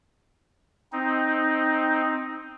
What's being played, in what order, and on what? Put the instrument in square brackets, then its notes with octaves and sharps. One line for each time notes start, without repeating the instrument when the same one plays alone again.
[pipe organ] C4 D#4